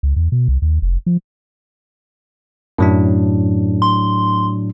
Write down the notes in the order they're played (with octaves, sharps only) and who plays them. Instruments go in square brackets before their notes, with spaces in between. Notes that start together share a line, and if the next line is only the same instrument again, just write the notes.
[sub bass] C#2
E2
B2
C2
D#2
F1
F3
[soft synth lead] F#2 [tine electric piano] A2 F#3 D4
[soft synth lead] C6